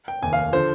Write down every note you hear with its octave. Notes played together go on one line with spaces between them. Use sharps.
G5
F1 D#2 D#3 G#5
F5
D3 F3 C5